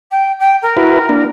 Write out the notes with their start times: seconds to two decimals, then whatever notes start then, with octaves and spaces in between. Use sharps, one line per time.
0.11 G5
0.39 G5
0.62 A#4
0.77 E4 F#4 B4
1.09 A#3 D4